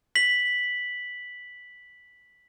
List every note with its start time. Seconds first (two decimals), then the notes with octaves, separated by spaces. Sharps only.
0.15 B6 F#7